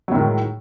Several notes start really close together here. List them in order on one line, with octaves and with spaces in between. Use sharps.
F#3 A2 D#3 G#3